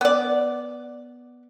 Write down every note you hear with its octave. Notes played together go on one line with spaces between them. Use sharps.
B3 D5